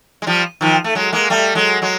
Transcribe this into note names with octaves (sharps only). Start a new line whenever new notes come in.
G#3
F3 G3
D#3 F3
A3
F#3 G#3
G#3 A#3
G3 A3
F#3 G#3
F#3 G#3